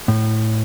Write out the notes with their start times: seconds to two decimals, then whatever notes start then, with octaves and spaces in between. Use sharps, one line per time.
0.08 A2